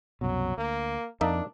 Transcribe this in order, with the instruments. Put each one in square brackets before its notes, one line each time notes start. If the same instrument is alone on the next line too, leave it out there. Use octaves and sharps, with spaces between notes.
[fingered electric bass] C2 F#2 B2 [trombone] F#3
[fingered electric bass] D2 [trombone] A#3
[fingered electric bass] F2 [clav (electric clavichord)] A#3 D#4 E5 [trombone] D4